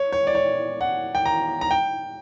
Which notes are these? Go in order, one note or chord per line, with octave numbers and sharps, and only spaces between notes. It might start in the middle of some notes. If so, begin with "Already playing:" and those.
Already playing: C#5
C#5
D5
C#5
F#5
G5
A#5
A#5
G5